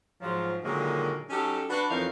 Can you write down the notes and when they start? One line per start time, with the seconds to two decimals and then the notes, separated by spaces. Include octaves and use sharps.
0.22 G#2 F3 F#3
0.64 A#2 D3 D#3 F#3 G#3 A#3
1.30 F#3 C#4 D#4 G4 A4
1.70 D4 F#4 B4
1.90 F2 E3 C#4 D#4 A#4 F5